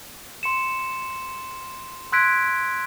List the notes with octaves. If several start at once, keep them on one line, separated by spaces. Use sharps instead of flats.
C6 C#7 E7
C6 E6 F#6 G#6 B6 D7